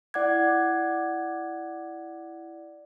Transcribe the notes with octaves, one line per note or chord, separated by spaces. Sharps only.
E4 D5 F#5 D6 F#6 G#6